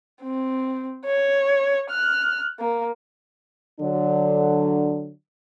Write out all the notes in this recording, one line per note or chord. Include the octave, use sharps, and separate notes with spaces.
C4
C#5
F6 F#6
A#3
D3 F#3 D4